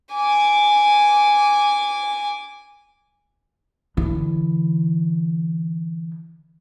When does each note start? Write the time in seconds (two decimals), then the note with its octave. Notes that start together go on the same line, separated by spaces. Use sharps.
0.14 G#5 D6
3.97 D3 E3